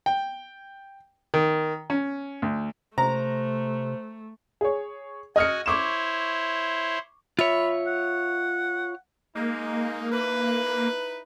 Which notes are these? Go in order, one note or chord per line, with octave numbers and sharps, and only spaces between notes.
G5
D#3
C#4
D2
C3 A3 C5 A#5
G#4 C#5
F#4 D#5 G#5 F6 C#7
E4 C5 C#5 C#6 D6 E7
F4 C#5 E5 B5
F#5
G#3 A#3 D#4
D#4 E4 B4